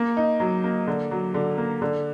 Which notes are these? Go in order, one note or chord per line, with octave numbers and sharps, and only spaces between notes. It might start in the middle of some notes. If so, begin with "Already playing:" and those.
Already playing: A#3
D#4
F#3
A#3
D3
F#3
D3
A#3
D3